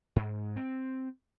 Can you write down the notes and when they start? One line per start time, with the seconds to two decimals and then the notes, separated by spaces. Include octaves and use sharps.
0.16 G#2
0.56 C4